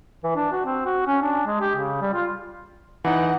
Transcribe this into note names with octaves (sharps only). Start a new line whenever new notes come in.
E3
D4
F#4
C4
F#4
C#4
D4
G#3
G4
C#3
G3
F4
E3 D#4 F#5